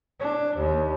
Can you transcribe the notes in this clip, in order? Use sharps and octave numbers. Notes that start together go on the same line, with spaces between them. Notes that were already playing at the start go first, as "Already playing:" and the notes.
D4
D#2